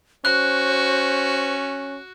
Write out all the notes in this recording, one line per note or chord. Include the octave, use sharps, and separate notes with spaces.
C#4 F#4 C5 F#6